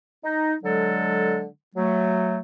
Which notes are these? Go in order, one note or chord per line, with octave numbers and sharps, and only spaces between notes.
D#4
D3 F#3 G#3 A4
F#3 A3